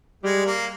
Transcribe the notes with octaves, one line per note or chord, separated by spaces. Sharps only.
G3 G#3
A#3